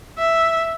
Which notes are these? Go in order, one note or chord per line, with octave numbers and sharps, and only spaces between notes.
E5